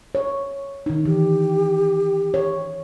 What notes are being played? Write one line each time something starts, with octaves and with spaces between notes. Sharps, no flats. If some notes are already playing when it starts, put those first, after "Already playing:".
C#5
D#3 D#4
E3 G4
C#5